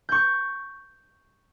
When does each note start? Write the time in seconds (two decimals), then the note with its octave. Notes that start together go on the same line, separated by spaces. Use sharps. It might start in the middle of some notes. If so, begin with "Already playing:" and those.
0.09 C#6 G6